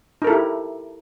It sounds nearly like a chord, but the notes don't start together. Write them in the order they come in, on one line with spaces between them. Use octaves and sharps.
D#4 A#4 A4 E4 G4